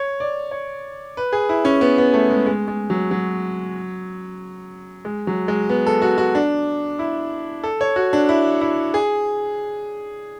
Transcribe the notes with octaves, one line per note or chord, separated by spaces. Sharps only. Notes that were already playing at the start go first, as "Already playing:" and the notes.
Already playing: C#5
D5
C#5
B4
G#4
E4
C#4
B3
B3
A3
G#3
G#3
G#3
F#3
F#3
G#3
F#3
G#3
B3
A4
F#4
F#4
D4
E4
A4
C#5
F#4
D4
E4
E4
G#4